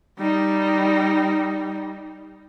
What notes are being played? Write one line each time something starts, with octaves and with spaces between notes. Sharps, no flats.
G3 D#4